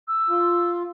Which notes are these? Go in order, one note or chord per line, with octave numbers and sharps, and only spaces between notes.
E6
F4